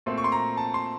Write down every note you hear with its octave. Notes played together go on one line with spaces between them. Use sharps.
A#2 A3 C4
C#6
C6
A#5
A5
C6